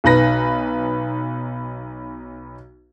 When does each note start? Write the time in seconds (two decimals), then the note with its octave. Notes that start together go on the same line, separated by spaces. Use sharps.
0.04 B1 D#4 B4 A#6